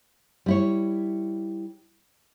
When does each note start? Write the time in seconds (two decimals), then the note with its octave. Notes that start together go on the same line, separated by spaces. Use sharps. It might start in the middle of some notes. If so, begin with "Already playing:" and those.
0.46 G3 E4 C#5